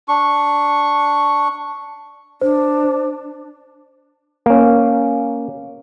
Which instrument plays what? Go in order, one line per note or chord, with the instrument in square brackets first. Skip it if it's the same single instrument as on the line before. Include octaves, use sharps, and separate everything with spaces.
[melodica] D4 C#6
[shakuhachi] D4 [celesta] C5
[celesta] C5
[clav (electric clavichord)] A#3 C#4